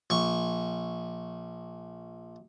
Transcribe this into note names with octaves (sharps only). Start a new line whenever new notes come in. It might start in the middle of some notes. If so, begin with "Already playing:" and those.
A#1 C#6